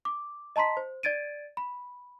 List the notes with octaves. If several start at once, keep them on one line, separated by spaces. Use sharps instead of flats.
D6
D#5 A5 A#5 C6 B6
C5
D5 G#6 A6 D7 D#7
B5